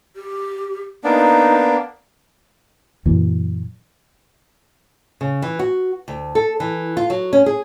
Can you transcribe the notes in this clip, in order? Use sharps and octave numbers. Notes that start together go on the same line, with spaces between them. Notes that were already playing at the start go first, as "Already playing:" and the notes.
G4
A#3 B3 D4 D#4
F#2 A#2 E3 F#3
C#3
E3
F#4
D2
A4
E3
F4
F#3
C#4
G#4